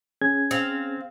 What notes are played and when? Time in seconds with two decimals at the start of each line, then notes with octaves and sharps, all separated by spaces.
0.21 C#4 G#4 G#6
0.51 C4 F5